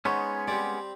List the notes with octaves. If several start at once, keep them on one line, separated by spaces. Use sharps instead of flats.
G#3 B3 C#4 D#4 C5 C#5 F#5 G#5
G3 C4 G4 C5 D5